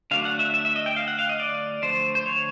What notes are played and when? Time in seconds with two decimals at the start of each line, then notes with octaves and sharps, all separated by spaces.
0.11 D3 F#3 A3 D4 F5
0.25 F#5
0.39 E5
0.54 E5
0.65 E5
0.76 D#5
0.86 G5
0.96 F5
1.08 F#5
1.19 F5
1.29 D#5
1.40 D5
1.82 D3 F3 A3 C5
2.15 C5
2.26 C#5